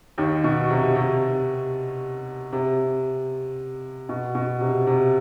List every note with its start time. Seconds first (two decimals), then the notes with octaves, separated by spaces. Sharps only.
0.18 D#2 D#3
0.44 B2
0.70 C3
0.96 C3
2.52 C3
4.09 B2
4.35 B2
4.61 C3
4.87 C3